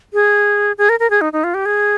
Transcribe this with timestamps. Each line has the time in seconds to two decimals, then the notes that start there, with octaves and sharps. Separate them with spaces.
0.13 G#4
0.78 G#4
0.89 A#4
1.00 A#4
1.10 G#4
1.21 D#4
1.33 D#4
1.44 F4
1.54 G4
1.66 G#4